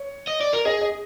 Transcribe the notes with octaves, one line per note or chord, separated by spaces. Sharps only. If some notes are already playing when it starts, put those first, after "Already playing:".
Already playing: C#5
D#5
D5
A#4
G#4 D#5
D#5